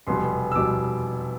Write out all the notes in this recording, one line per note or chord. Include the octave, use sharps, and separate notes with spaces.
F1 E2 B2 G3 B3 C6
E6
F1 E2 B2 G3 B3 D6